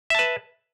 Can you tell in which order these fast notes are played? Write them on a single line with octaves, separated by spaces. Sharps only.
E5 A5 B4